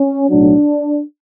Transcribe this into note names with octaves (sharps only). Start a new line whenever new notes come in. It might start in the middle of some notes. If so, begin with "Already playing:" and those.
Already playing: C#4
B1 A2 F#3 D4